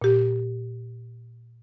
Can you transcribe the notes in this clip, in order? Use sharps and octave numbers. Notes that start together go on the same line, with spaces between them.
A#2 G4